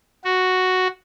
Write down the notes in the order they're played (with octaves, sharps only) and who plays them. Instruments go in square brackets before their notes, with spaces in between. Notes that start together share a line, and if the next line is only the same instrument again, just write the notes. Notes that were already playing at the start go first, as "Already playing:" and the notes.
[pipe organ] F#4